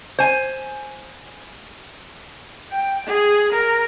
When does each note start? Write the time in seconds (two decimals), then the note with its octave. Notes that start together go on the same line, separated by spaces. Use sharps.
0.19 C5 G#5
2.72 G5
3.07 G#4
3.53 A#4